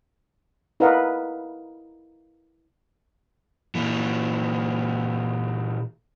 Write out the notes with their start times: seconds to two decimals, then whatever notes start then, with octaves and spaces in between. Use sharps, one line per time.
0.80 E4 A#4 B4 D#5 F5 F#5
3.75 A#2 E3